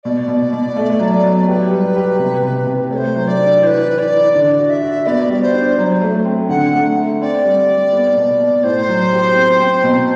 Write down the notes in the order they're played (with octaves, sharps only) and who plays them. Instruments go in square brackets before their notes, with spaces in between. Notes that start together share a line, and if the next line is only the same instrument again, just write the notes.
[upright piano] B2 [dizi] D5
[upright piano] B2
B2
A3
F#3
F#3
[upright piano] G4 [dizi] B4
[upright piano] G3
G4
C3
C3
C3
[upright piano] A3 [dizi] C5 D5
[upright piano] F#3
[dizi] D5
[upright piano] D4
[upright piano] E3 [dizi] C5
[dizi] B4
[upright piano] E3
[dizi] D5
[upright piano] E3
[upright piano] D3 [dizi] D5
[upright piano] F#4
[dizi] E5
[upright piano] F#4
[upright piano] B3 [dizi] D5
[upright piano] G3 [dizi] D5
[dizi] C5
[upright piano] D4
[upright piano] F#3 [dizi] C5 D5
[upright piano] A3
C4
[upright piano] D3 [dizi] F#5
[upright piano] A3
A3
[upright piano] C4 [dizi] D5
[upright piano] G3
G3
B3
B2
B2
[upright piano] A2 [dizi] C5
[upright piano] F#3
G4
C4
C4
B2